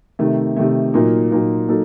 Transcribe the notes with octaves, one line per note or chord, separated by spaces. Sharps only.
C3 D#3 A3
C3 D#3 A3
A#2 F#3 A#3 D#4
A#2 F#3 A#3 D#4
F#3 A#3 D#4 A4